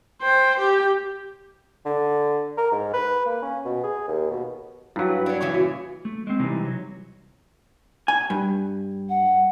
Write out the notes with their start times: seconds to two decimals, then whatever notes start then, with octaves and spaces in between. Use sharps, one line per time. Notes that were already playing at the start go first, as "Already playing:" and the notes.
0.22 C5 G5
0.58 G4 G5
1.86 D3
2.58 A#4
2.72 G#2
2.94 B4
3.26 A#3
3.42 C#4
3.65 B2
3.83 G#4
4.08 D#2
4.31 B2
4.96 G2 F#3 E4 B4 F5
5.26 B3 D4 C#5
5.41 A#2 C#3 E3 C#6
5.54 F#4
6.05 A3
6.27 G#3 C4
6.40 C3 E3 G3 D#4
6.65 F#3
8.08 G#5
8.30 G2
9.09 F#5